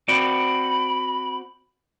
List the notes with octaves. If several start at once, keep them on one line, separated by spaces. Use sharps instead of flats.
C4 F#4 D5 B5